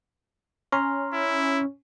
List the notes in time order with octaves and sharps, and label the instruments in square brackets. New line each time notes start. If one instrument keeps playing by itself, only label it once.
[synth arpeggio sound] C#4 [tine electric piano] A#5 C6 F6
[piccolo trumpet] E4